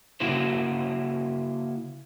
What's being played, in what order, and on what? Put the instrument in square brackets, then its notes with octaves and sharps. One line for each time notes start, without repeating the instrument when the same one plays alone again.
[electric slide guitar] C#3 A#3 E4 F#4 C5